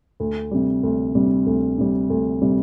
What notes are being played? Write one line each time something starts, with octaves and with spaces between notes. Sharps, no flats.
D2
C3 G3
D2
C3 G3
D2
C3 G3
D2
C3 G3